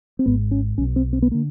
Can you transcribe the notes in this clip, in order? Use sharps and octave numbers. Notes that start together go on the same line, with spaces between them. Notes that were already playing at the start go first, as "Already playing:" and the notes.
C4
G#1 G#2 B3
C#4
B1 B2 C#4
C4
C4
B3
D3 A#3